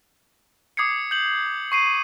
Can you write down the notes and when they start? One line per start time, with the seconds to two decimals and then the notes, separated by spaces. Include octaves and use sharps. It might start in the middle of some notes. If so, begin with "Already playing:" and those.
0.77 D6 D#6 G#6 C7 C#7
1.11 G6 F#7
1.72 C#6 C7 D#7